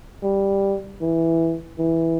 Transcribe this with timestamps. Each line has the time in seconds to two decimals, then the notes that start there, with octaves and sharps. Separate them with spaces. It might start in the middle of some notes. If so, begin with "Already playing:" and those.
0.23 G3
1.01 E3
1.79 E3